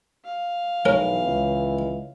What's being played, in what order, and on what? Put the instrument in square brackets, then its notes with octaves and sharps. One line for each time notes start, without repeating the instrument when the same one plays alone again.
[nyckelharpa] F5
[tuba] B1 [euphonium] E3 [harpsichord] C#4 A#4 C#5
[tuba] C#2